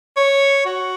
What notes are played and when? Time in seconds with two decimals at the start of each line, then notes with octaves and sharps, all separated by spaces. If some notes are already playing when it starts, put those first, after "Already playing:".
0.16 C#5
0.65 F#4